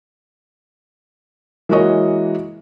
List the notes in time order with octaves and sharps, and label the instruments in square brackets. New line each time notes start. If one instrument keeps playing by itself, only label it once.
[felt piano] E3 G#3 A#3 F#4 C#5 D#5